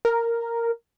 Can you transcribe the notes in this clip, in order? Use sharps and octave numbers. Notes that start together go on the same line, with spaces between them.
A#4